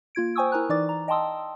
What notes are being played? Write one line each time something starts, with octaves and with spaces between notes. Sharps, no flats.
A#3 F4 G#6 D7
C5 G5 G#5 C#6 D#6 E6
E4 A#4 G#5 A#5 F#6
E3 D#4 D5 D6 A6
A#5
D#5 G5 A5 C6 D#6 E6